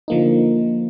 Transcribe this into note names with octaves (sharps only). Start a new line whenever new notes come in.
D3 F3 A#3 D#4